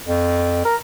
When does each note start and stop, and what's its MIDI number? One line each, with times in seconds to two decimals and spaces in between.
0.07 0.63 41
0.65 0.76 70